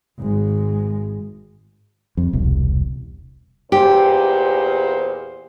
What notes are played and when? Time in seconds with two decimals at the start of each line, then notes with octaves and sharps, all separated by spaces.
0.18 G#1 G#3
2.17 F2
2.33 E1 C2
3.72 E2 A#2 G4 C5